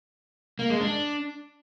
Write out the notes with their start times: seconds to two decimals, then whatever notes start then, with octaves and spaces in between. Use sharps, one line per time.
0.59 A#3
0.70 G#3
0.81 D4